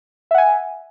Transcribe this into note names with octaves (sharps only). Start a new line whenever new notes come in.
E5 F#5 G#5